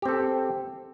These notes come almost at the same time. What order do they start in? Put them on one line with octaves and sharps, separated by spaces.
G4 C4 A4